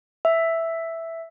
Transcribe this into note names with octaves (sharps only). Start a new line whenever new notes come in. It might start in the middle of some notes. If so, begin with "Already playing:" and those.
E5